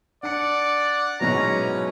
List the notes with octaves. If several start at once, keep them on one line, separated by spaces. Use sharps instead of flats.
D4 D5 F#5 C#7
G#2 B2 F#3 C#4 E4 B4 C#5 A#5